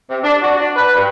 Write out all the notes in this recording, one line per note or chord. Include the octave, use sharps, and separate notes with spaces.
C3
D4
F#4
D4
B4
G2